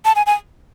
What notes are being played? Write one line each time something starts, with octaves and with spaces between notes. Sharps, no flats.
A5
G#5
G#5